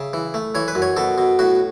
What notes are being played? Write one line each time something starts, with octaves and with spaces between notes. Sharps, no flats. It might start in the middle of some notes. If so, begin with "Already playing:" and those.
Already playing: C#3 E5
E3
A3
E3 C#5
B4
F#2
C#5
B2 A4
B2
A2 F#4